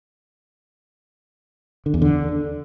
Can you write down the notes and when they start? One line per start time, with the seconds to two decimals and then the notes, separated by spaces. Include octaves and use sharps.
1.86 D3
1.94 E2
2.02 D3